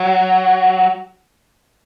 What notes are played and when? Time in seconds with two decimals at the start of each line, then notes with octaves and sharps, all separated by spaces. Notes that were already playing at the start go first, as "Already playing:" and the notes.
Already playing: F#3